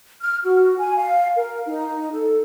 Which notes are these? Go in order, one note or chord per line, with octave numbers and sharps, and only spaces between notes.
F6
F#4
G#5
F5
A#4
D#4
A4